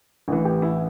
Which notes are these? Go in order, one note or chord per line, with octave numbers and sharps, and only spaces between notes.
A1 A2 E3
G4
E4